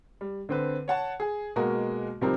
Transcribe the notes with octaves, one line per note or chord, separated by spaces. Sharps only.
G3
D3 C4 B4
C#5 F#5 A5
G#4
B2 G#3 A#3 F#4 A#4
C3 F3 G3 C4 D#4 A#4